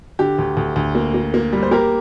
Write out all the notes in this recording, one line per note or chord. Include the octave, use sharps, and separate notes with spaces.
D3 G4
D2
D2
D2
A#3
A#3
A#3
G3
C5
A#3 G4 A#4